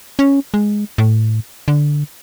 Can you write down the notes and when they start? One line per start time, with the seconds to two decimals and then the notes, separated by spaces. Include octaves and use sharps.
0.19 C#4
0.54 G#3
0.98 A2
1.68 D3